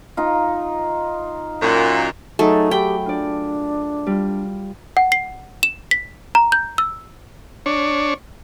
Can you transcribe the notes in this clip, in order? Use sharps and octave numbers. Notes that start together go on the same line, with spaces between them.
D#4 F4
F#2 A#2
F#3 A3 D#4 G#4 A4
G4 G5 B5
D4 F4 D5
G3 F4
F#5
C7
E7
B6
A#5
G6
E6
D4 C#5